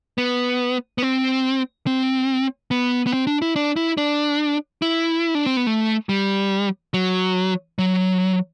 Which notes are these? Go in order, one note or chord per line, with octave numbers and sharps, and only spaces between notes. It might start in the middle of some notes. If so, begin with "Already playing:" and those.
B3
B3
C4
C4
B3
B3
C4
D4
E4
D4
E4
D4
E4
D4
C4
B3
A3
G3
F#3
F#3